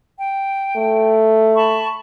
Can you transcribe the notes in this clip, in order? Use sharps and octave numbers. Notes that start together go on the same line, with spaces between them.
G5
A3
A5 B5 C#6